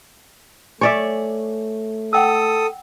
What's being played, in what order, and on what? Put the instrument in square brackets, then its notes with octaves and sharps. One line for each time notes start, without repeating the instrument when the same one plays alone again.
[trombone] A3 [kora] C#5 D5 E5 [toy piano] G#5 C#6 D6
[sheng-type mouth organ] A4 D#6 [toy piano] F#5 G5 E6